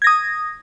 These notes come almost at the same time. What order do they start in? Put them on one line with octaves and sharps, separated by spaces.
G#6 A#6 D#6